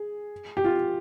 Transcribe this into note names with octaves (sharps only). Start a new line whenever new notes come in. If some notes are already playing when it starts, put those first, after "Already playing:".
Already playing: G#4
G4
F4